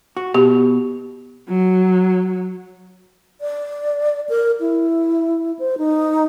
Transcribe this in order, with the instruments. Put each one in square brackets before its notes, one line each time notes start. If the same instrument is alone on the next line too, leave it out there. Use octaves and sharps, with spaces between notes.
[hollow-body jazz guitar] F#4
[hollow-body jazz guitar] B2 [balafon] G4
[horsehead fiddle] F#3
[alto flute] D5
A#4
E4
C5
D#4